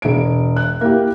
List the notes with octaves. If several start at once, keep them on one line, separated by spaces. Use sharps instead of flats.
E1 D7
F#6
A#3 E4 G4